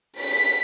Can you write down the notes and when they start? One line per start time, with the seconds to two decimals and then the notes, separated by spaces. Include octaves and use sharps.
0.21 B6